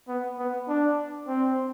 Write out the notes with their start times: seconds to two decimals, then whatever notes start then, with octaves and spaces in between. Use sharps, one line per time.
0.08 B3
0.38 B3
0.68 D4
1.27 C4